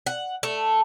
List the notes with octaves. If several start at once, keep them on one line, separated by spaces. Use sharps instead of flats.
F#5
A3